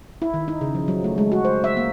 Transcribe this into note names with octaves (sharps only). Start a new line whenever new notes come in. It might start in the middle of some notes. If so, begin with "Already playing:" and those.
E4
D#3
D#4
C#3
F3
F#3
A3
G#3
F#4
C5
E5
A#3